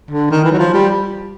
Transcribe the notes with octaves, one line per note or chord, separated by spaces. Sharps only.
D3
D#3
E3
F#3
F3
G3